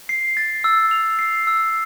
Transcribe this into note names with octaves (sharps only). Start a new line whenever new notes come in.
C7
A6
E6
F7
C7
E6